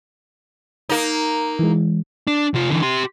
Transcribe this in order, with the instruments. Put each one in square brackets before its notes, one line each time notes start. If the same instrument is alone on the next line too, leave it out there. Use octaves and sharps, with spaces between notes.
[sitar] A#3 D#4
[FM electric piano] E3 G#3
[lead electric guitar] D4
C3 F4
D3 E3
G4 C6